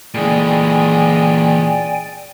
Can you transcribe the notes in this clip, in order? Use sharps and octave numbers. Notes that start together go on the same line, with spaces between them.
A#2 E3 G#3 D5 G5 G#5